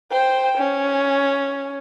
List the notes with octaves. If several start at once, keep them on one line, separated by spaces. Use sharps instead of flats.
C5 G5
C#4